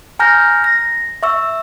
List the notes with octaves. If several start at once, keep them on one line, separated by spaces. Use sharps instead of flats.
G#5 A#5 F6 G6 A#6
A#6
E5 C#6 E6